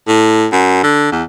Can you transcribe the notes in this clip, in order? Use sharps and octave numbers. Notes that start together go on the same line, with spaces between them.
A2
F#2
D3
E2